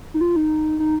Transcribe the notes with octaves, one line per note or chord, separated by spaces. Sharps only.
D#4
F4
D#4
D#4